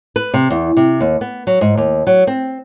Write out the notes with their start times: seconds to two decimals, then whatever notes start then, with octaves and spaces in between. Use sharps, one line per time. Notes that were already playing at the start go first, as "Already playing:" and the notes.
0.16 B4
0.34 C3
0.50 E2
0.77 C3
1.00 D#2
1.21 B3
1.47 F#3
1.61 G#2
1.77 D#2
2.07 F#3
2.27 C4